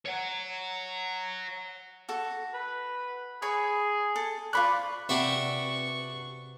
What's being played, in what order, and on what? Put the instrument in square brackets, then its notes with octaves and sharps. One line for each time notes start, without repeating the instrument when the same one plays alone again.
[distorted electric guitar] C#5 F#5
[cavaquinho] F#4 A4
[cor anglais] B4
[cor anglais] G#4 [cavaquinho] C#5 B5
[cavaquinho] A4
[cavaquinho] F4 C5 C#6 [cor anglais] D5 [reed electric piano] B5 F#6
[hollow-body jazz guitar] C3 [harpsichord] D4 F#4 E5 [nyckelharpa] B4 C#6